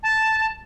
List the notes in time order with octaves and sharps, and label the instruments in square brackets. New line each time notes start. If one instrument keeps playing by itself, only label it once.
[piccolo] A5